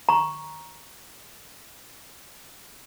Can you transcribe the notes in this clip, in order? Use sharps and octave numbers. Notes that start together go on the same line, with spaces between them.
A#5 C#6